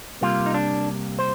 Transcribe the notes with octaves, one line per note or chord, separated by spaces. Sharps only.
C3 G3 A#3 F4
D#4
D4
C5